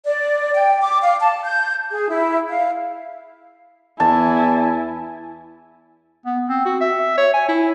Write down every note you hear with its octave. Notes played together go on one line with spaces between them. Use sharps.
D5
G5
D6
F5
A5
G6
G#4
E4
F5
E2 E4 G#5 A5
B3
C4
F#4
E5
C#5
G#5
E4